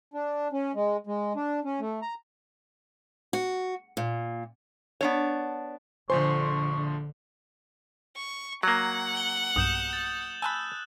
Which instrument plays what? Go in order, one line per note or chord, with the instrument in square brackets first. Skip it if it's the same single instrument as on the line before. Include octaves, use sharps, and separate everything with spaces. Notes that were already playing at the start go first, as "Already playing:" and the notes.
[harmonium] D4
C#4
G#3
G#3
D4
C#4
A3
A#5
[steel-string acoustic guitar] F#4
A#2
[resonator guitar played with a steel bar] B3 D4 C#5
[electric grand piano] A#1 F3 C6 [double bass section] D3 [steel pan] C5 G#5 [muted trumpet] C#6
[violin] C#6
[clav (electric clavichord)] F#3 A#3 [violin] F#5
[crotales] F#7 G7
[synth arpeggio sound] B1 G2 [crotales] D#6 G6 E7
[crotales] A6
[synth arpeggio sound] G#5 A5 B5 [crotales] E6 F#6